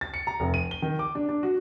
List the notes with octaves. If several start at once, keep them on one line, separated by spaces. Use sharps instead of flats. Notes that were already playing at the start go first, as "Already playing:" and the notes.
A6
C#7
A#5
F1
D#7
G7
D#3
D6
D4
D4
F#4